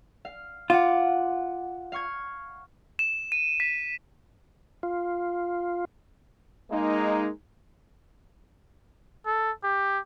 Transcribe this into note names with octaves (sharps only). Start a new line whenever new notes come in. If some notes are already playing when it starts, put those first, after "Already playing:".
F5
F4 F#5 D6
F5 C#6 G#6
E7
D#7
B6
F4
G#3 A#3 D#4
A4
G4